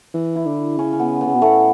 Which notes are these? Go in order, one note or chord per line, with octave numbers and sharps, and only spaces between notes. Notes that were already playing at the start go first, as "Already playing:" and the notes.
E3
E4
D3
C#3 C#4
C#4
B3
B3
C#3
B2
A2 A3